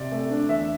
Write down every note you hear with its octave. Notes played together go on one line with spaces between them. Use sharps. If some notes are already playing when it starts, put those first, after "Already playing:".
Already playing: C3 D5
A3
D4
E2 E5